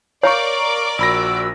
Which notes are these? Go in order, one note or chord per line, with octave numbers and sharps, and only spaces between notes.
A#4 C#5 D5 F5 A#5 C#6 D6
A#1 F#4 B5 E6 A#6